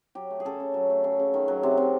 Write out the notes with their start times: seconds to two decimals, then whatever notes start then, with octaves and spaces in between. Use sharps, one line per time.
0.15 F#3 G4
0.31 A3
0.40 G#4
0.45 C#3 A4
0.60 C#3
0.74 F#3
0.90 A3
1.04 C#3
1.20 C#3
1.34 D#3
1.48 F#3
1.63 C3
1.77 C3